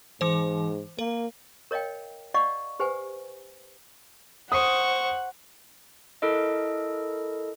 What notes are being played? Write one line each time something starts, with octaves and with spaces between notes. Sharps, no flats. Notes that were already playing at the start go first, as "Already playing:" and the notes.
G#2 E3 C5
A#3 A#4
A#4 C#5 D#5 F5 G5
D5 D#5 F5 F#5 C#6
G4 B4 C5 F#5 G#5
C5 F#5 C#6 D#6
E4 A4 A#4 D#5